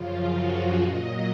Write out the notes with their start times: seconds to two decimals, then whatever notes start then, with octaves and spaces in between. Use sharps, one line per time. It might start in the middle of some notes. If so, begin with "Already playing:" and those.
Already playing: F#2 C#3 F3 F4
0.31 F#4
0.79 A#2 F#3 D#5